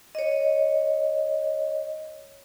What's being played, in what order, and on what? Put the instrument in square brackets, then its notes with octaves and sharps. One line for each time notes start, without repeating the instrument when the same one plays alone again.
[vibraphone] C#5 D#5